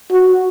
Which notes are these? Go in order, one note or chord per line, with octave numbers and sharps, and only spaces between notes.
F#4